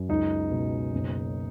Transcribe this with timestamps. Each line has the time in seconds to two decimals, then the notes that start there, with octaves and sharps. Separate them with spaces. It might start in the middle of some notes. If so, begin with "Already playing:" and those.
Already playing: F#2
0.09 C#2 D#4
0.51 B2
0.93 F#1